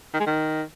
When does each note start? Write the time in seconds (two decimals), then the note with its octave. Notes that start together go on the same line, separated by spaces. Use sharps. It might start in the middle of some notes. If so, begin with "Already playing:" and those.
0.14 D#3
0.20 G#3
0.26 D#3